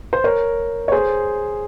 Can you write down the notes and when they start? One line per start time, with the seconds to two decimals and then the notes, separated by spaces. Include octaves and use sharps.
0.13 C5
0.24 A#4 C#5
0.88 C#5
0.92 G#4 C5